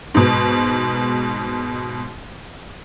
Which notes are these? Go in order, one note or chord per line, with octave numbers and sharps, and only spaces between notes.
G#2 B2